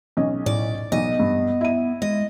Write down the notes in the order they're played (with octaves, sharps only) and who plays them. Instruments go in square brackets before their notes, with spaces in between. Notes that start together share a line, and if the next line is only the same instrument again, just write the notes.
[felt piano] B1 C#4 D#5
[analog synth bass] A2 [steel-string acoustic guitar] D5
[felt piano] B1 [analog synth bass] B3 [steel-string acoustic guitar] D#5
[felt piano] G2
E4 D#7
[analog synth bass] G#3 [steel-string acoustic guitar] D#5